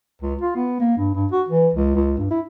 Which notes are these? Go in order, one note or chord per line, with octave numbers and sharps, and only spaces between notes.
C#2
F4
B3
A#3
G2
G2
F#4
E3
C#2
C#2
G2
E4